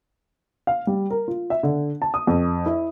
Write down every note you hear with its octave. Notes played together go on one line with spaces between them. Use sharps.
F5
G3
A#4
F4
E5
D3
A5
D#6
F2
E4